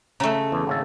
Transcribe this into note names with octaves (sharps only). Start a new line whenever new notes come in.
C#3 A3 A#5
E2
G#1 C#3 A4